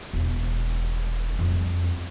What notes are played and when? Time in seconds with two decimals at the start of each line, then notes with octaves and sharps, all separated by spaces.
0.13 E1
1.39 F2 G3